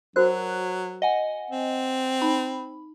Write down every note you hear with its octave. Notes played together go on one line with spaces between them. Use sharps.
F#3 F#4 A#4 C5 F#6
D#5 F#5 G#5
C4
D#4 B5